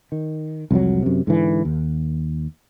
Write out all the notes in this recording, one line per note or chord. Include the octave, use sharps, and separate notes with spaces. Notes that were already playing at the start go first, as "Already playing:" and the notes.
D#3
C2 F2 E3 F#3
F#2 C3
G#2 D3 E3
D#2